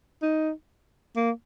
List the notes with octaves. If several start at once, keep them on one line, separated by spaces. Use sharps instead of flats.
D#4
A#3